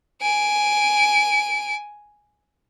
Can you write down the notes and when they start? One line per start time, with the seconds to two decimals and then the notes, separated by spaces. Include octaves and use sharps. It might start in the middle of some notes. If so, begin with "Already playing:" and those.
0.22 G#5 D7